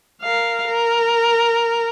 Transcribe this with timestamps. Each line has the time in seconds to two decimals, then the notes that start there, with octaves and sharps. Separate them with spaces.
0.22 A#4 F5
0.68 A#4